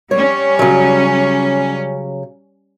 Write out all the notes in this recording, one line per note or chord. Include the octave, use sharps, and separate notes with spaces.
G3 C#4 C#5
C#3 F#3